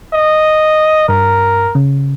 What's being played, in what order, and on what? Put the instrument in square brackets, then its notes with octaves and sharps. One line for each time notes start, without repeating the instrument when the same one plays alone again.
[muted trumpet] D#5
[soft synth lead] G2 [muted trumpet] A#4
[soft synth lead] C#3